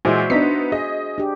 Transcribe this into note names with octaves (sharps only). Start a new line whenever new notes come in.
A#2 E3 G#3 F#4 C5 E5
B3 D4 D#4 B6
G#4 D#5
D4 G4